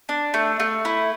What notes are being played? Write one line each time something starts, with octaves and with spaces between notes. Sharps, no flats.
D4
A3
A3
E4